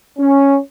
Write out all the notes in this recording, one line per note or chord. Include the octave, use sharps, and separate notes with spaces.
C#4